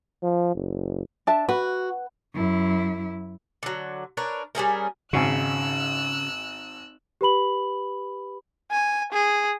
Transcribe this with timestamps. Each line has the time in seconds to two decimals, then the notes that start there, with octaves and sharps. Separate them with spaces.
0.22 F3
0.55 F#1
1.27 D4 E5 A5
1.49 F#4 B4
2.33 F#2 E4
3.63 D3 F#3
4.17 D4 A#4 B4 C#5
4.55 G3 C#4 G#4 A#4
5.13 G#1 G#2 C#3 F#4 E6 F#6
7.21 G4 B4 B5 F#7
8.71 G#5
9.12 G#4